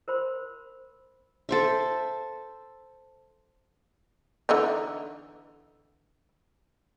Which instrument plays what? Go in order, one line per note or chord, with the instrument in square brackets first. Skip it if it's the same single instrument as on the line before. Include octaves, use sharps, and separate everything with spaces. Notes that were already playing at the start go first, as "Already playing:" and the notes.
[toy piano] A#4 C5 B5 C6
[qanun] A4 C5 E5
[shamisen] D3 E3 D#4